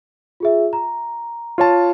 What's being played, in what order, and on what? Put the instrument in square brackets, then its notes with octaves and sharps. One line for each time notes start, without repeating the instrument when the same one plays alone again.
[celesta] F4 G#4 E5
A#5
[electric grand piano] F4 C#5 A5